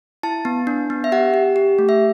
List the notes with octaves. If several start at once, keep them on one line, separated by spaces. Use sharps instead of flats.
E4 A5
B3
D4
B3
E5
G4 F#5
G4
G4
A3
E5